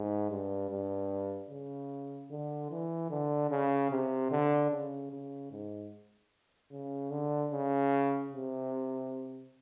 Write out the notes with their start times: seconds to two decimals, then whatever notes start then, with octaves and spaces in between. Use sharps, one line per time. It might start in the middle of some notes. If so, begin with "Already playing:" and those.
Already playing: G#2
0.30 G2
0.70 G2
1.50 C#3
2.31 D3
2.71 E3
3.10 D3
3.50 C#3
3.90 C3
4.31 D3
4.71 C#3
5.11 C#3
5.51 G#2
6.72 C#3
7.11 D3
7.52 C#3
8.32 C3